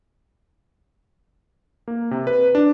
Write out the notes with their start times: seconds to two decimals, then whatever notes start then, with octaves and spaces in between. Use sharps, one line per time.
1.88 A#3
2.11 C3
2.27 B4
2.55 D4